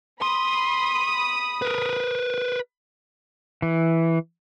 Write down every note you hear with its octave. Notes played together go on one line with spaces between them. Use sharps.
B5 C6 D#6
A#4 B4
E3